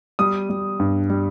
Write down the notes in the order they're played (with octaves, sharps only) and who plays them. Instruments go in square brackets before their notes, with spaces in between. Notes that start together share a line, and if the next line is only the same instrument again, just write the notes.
[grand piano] G3 D#6
G3
G2
G3